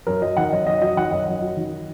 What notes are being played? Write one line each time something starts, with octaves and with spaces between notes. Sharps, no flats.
F#2 A#4
F#3 D#5
D#3 F#5
F#2 D#5
F#2 D#5
F#3 D#5
D#3 F#5
F#2 D#5
F#2
F#3
D#3